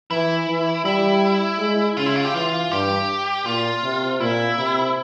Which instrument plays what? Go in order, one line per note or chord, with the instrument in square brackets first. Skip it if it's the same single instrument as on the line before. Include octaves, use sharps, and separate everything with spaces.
[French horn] E3 [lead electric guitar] E4
[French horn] E3
[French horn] G3 [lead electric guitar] E4
[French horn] G#3
[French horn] C#3 [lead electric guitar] F4
[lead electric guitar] E4
F4
G4
[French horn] E3 [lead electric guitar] F4
[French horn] G2 [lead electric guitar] G4
[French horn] A#2 [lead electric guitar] F4
[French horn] C3
[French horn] A#2 [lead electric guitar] E4
[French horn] C3